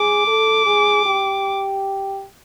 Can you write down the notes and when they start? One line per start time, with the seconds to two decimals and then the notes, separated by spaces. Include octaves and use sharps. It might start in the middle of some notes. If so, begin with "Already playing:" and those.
Already playing: G#4 D6
0.27 A4
0.66 G#4
1.05 G4